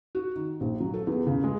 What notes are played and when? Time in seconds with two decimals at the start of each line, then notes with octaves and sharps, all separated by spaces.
0.15 F#4
0.36 D#3
0.61 A#1
0.80 F#3
0.94 A4
1.07 E2
1.27 C#3
1.44 G#3